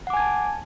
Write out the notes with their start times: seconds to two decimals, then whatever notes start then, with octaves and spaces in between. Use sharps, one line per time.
0.07 F#5
0.10 D6
0.13 G#5
0.17 G#6
0.20 A5